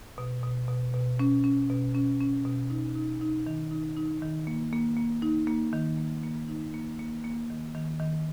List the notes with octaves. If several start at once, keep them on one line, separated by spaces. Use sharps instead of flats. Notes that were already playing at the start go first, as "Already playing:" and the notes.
B2
B2
B2
B2
C#4
C#4
B2
C#4
C#4
B2
D#4
D#4
D#4
D#3
D#4
D#4
D#3
A#3
A#3
A#3
D#4
A#3
D#3
A#3
A#3
D#4
A#3
A#3
A#3
D#3
D#3
D#3